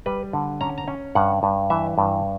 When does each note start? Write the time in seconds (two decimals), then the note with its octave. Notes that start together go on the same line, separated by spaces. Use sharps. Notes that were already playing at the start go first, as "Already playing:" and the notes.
0.06 G3 B4
0.33 D3
0.61 C#4 A#5
0.78 A#5
0.88 C#4
1.15 G2 F#5
1.43 G2
1.70 E3 E5
1.98 G2